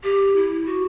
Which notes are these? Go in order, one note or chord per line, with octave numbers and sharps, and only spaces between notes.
G4
E4
F#4